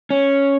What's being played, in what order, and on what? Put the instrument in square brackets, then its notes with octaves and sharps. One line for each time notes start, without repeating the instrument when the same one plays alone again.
[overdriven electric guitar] C#4